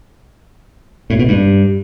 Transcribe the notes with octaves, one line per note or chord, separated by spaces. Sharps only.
A2
B2
G2